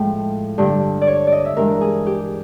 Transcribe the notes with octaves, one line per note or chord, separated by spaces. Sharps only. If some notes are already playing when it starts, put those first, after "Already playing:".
Already playing: A2 F3 G#3 G5
G2 D3 G3
D5
C#5
D5
D#5
E5
G2 E3 G#3 A#4
G#4
G4